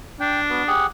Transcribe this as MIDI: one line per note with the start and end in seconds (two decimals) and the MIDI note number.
0.20 0.69 62
0.20 0.40 79
0.50 0.63 59
0.50 0.63 66
0.67 0.86 67
0.67 0.86 68
0.67 0.86 78